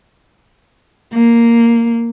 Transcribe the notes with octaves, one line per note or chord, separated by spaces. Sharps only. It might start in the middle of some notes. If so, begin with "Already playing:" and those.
A#3